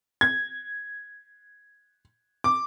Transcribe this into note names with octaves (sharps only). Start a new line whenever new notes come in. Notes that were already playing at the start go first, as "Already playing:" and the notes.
G#6
D6